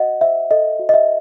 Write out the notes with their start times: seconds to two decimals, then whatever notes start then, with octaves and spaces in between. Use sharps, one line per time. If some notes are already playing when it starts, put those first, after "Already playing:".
Already playing: F#4 D#5 F#5
0.21 C5 E5
0.51 A4 D#5
0.79 F#4
0.89 D#5
0.94 E5